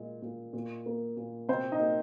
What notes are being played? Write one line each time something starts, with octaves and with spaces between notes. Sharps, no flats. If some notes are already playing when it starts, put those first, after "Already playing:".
Already playing: A#2 G#3
A#2
A#2
A#3
A#2
C3 C4 C5
D#4 D#5
A#3